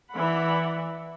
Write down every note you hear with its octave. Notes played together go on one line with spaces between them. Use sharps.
E3 D5 E5 F#5 B5